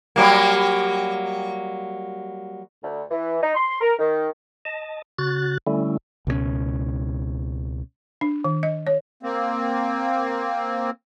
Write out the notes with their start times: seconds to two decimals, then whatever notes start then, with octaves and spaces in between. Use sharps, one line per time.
0.16 F#3 G3 A#3
2.84 D2
3.10 E3
3.42 D#4
3.55 C6
3.80 A#4
3.99 D#3
4.65 D#5 A5
5.19 C#3 F#4 F#6 A6
5.67 D3 G3 A3 C#4 E4
6.27 C#2 B2 F3 C#4
8.21 D4
8.44 D#3
8.63 D#5
8.87 C#5
9.23 A#3 C4